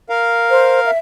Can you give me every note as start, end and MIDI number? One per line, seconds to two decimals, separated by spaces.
0.09 0.91 70
0.09 0.91 77
0.50 0.80 72
0.86 0.98 76